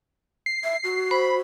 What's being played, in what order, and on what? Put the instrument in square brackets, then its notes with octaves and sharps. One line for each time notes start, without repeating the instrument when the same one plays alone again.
[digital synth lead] C7
[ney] E5
F#4
[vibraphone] C5 [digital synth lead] B5